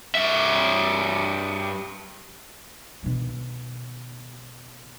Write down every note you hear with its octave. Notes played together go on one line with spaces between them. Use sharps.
G2 E5
B2 D#3